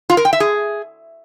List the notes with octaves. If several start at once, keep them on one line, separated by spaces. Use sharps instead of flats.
F4
A#4
G5
E5
G#4